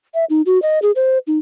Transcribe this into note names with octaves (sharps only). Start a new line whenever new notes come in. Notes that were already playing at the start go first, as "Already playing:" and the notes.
E5
D#4
F#4
D#5
G#4
C5
D#4